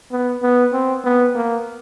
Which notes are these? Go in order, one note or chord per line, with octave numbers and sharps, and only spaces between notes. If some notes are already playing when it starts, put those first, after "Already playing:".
B3
B3
C4
B3
A#3